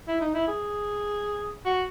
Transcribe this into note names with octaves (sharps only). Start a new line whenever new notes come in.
E4
D#4
E4
G#4
F#4